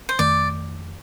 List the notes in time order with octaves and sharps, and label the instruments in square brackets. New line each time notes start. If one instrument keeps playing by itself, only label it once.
[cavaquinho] C5
[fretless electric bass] F2 D#3 A3 [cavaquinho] D5